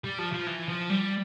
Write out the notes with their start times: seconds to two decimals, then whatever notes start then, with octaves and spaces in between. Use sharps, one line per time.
0.04 G3
0.18 F3
0.33 F3
0.47 E3
0.68 F3
0.90 G3